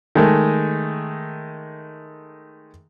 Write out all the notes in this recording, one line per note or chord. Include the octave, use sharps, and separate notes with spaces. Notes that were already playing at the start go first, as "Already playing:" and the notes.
D#3 G#3 A3